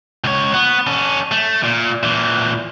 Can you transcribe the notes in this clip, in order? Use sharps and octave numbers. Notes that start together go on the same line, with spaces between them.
C#2 C#5
B3
C#4 A4
A3
A#2
A#2 E3